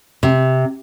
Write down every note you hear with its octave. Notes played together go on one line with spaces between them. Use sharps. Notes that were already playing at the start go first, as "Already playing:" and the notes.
C3